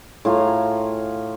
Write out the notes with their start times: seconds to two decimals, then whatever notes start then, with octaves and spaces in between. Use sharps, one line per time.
0.25 A2 F4 G#5 A#5